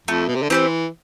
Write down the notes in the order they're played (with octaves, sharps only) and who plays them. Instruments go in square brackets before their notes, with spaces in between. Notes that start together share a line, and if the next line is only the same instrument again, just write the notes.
[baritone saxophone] F2 [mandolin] A3
[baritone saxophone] B2
C3
D3
[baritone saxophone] E3 [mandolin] C4 G4 C5